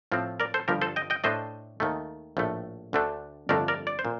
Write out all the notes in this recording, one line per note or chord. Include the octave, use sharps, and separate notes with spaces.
A2 F3 C4
A#4 D5
A4 C5
G1 G2 F3 G4 A#4
A4 C5
D#5 G5
D#5 G5
A2 A3 D4 C5 D#5
D#2 D#3 A3
A#1 A2 A3
D2 D3 A3 D4
G1 F2 D3 A3 D4 A#4 D5
A#4 D5
D5
C5
A#2